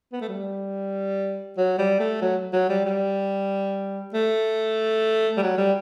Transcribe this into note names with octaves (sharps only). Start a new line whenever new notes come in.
B3
A3
G3
F#3
G3
A3
F#3
F#3
G3
G3
A3
G3
F#3
G3